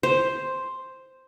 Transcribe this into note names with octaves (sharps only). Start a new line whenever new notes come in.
C5